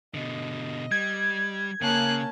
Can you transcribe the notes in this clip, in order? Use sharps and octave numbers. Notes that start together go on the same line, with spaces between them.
B2 D3 D#5
G3 G#6
C#3 A#3 C#4 A5 F#6